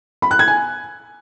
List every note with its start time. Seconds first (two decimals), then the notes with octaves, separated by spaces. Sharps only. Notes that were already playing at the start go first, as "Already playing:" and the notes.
0.22 B5
0.31 F#6
0.39 G#6
0.48 G#5